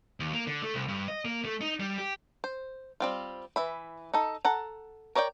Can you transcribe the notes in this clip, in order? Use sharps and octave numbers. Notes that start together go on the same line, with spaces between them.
D#2
A#3
D3
A3
C2
G2
D#5
A#3
A3
D#4
G3
G4
C5
G3 C4 F4
E3 E5 B5
D#4 A4
A4 F#5 A#5
A#4 C#5 D5 E5 G5